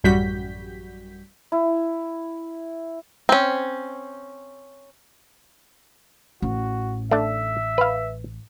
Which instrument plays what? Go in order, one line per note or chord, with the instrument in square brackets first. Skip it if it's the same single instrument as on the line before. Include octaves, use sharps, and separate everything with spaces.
[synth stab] A1 F#2 G3 F#4 G6 B6
[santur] E4
[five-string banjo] C4 C#4
[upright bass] A1 [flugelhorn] F#4
[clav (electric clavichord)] A3 D4 [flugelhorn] E5
[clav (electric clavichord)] B4 F5